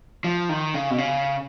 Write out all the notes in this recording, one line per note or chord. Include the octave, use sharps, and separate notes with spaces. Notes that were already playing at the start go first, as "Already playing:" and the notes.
F3
D#3
C#3
B2
C#3